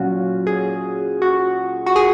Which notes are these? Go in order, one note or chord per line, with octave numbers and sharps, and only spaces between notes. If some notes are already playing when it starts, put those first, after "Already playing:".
Already playing: A#2 F#3 C#4 F4 F#4
G#4
F#4
F#4
G#4